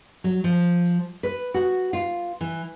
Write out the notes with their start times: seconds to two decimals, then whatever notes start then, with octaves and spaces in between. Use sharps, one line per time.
0.24 F#3
0.44 F3
1.23 B4
1.54 F#4
1.93 F4
2.41 E3